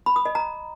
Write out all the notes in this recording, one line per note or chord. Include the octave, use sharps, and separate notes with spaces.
B5
D#6
D#5
A#5